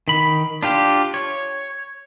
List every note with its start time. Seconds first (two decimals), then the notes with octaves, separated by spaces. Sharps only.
0.08 D#3 B5
0.63 D4 F4 G4
1.14 C#5